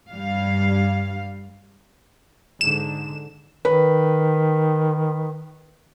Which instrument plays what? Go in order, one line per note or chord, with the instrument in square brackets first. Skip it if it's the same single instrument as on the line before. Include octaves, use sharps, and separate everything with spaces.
[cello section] G2 G3 F5
[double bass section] G#2 D3 [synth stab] E7
[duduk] D#3 [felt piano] B4